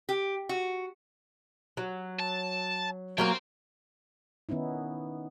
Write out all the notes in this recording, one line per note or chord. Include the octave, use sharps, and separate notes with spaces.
G4
F#4
F#3
A5
F#3 A#3 A#4 C5 G5
D#3 B3 C#4 D#4 E4